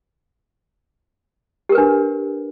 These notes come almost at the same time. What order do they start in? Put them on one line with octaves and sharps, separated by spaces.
G4 A#4 B4 D4